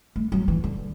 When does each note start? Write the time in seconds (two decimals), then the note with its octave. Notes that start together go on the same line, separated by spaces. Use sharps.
0.16 A3
0.32 F#3
0.48 E3
0.64 D3